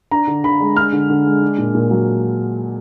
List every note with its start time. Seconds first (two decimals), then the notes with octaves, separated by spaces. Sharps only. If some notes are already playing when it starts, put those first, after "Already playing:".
0.11 D4 A#5
0.27 D3
0.44 D3 B5
0.61 G#3
0.76 D4 F6
0.93 D3
1.10 D3
1.26 G#3
1.42 D4
1.58 A#2
1.74 A#2
1.91 F#3